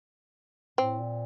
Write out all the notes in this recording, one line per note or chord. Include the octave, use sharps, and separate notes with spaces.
A2 C4
A#2